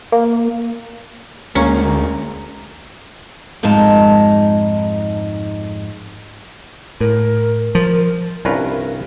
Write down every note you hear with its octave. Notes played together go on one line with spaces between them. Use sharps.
A#3
D2 G#3 A#3 C#4 A#5
F2 G#2 G#3 D#4 A5
A2 A#4
F3 A#4
C2 G2 C#4 F4 A#4 B4